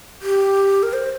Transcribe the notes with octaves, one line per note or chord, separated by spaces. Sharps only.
G4
A#4
C5